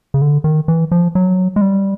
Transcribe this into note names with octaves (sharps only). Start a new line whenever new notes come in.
C#3
D3
D#3
E3
F3
F#3
G#3
G3